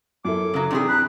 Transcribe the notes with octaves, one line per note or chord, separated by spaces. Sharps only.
F#2 E4 A4 D6
C#3 F#3
C3 E3 D4 D#4 G#4
B5 F#6